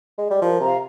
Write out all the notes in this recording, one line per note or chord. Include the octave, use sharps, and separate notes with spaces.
G#3
G3
F3 A#4
C3 A#5
F5